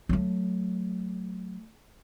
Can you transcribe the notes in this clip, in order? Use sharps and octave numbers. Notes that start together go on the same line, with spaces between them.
F#3 A3